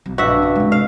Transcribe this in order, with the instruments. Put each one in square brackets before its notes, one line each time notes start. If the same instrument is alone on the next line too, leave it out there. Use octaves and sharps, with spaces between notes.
[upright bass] B1
[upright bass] A#1 [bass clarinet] G2 [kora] F#4 E5
[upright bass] C#3 F4
C3 G#3
[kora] F5